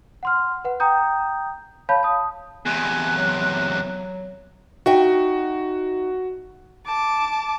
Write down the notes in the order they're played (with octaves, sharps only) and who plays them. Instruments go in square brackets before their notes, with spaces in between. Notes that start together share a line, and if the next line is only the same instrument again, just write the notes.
[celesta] F#5 C6 F6
B4 F#5
G5 A#5 D#6 G6
C#5 F5 A5 B5 G6
A5 D#6
[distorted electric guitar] E2 C3 [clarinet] G#5 [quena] F#6
[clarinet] F#3
[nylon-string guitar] D#4 E5 G5 [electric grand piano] F#4
[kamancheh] A5 D6